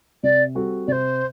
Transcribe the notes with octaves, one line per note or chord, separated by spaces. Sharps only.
C3 D5
G3 C4 F#4 A4
C3 C5 D5